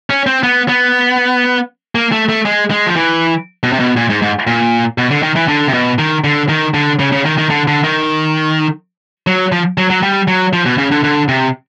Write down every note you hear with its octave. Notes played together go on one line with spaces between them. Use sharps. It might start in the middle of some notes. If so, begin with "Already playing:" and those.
C#4
C4
B3
B3
A#3
A3
A3
G#3
G#3
F3
E3
B2
C3
B2
A#2
G#2
G#2
A#2
B2
D3
D#3
E3
D3
C3
B2
D#3
D3
D#3
D3
C#3
C#3
D#3
D#3
D3
D3
D#3
F#3
F3
F#3
F#3
G3
F#3
F3
B2
C#3
D3
D3
C3